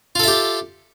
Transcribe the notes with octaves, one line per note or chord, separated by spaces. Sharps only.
F4 G4 A4 E5